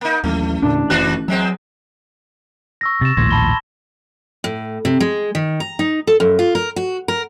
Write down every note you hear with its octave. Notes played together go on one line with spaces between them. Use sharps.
A#3 D#4
A1 D#2 F#3 A3
E2 A#2 D3 D4
F1 D#3 D4 F#4 F#6
E2 F#3 G#3 C4
C#6 E6 A#6
C3 A6 E7
A#1 D#2 A2 C6 G#6 A#6
A5 B5 G7
A2
C3
G#3
D#3
A#5
D#4
A4
F#2
F4
A#4
F#4
A#4